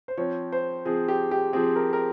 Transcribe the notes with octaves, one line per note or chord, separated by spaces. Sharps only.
C5
F3 C4 C#5
C5
F3 C4 G#4
G4
G4
F3 C4 G#4
A#4
A#4